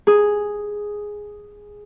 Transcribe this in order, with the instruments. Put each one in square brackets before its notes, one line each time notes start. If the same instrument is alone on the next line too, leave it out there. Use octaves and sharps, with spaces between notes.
[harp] G#4 D#6